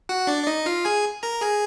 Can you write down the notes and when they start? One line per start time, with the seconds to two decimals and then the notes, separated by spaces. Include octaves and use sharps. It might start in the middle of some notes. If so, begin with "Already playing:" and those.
0.09 F#4 F#5
0.27 D4 D5
0.43 D5
0.47 D#4 D#5
0.66 F4 F5
0.85 G#4 G#5
1.23 A#4 A#5
1.41 G#4 G#5